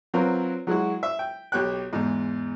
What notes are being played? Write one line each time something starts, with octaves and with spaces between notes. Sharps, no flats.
F#3 C4 F4 A#4 B4 C#5
F#3 G#3 E4 F#4
E5
G5
B1 G4 C#5 G5 F#6
E2 G#2